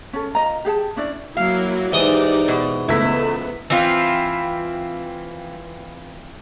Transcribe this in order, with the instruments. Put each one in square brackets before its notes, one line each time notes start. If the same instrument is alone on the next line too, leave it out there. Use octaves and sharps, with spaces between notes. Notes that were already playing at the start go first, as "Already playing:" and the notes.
[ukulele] C#4 A4
F4 D#5 A#5
G4 G#4 F#5 A5
C#4 D4 E4 D5
[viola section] F#3 A#3 E4 [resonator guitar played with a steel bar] F5
[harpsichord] G#2 E3 D#6 [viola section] D#4 G4 D5
[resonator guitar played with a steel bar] B2
[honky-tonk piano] C#2 A3 B6 [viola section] B3 [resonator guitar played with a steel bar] E4
[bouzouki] E3 C4 E4 F4